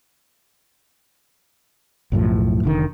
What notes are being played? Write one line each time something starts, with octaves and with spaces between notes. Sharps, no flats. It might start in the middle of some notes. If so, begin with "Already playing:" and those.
B1 F#2 A2 F3
F1 D3 D#3